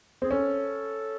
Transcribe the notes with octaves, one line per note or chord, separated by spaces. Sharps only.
C4 G#4
C#4 A4